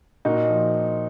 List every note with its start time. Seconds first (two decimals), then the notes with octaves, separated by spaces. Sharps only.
0.25 A#2 D#4 F#4
0.49 F3